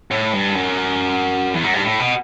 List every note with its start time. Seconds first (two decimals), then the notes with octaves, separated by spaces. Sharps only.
0.11 A2
0.33 G2
0.54 F#2
1.54 E2
1.64 F#2
1.74 G2
1.84 A2
2.00 B2